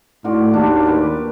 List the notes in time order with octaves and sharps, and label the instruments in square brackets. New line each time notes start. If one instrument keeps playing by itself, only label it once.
[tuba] A2 [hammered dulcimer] F4 F#4 D5
[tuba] D#2 [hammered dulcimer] A#3 D4
[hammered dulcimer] G4 B4